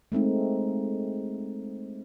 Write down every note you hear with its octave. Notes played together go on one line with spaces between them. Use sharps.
G#3 A3 C4 D#4